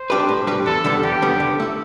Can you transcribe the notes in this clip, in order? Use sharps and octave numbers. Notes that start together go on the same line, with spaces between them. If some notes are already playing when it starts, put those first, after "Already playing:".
Already playing: C5
G3 D4 G4 B4
A2
G3 D4 G4 B4
E2 A4
D3 G3 B3
E2 G4
D3 G3 B3
D3
A3 E4